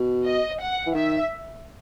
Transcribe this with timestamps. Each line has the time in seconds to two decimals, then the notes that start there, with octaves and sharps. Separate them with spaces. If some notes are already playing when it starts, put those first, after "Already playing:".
Already playing: B2
0.26 D#5
0.60 F#5
0.86 E3
0.94 D#3 E5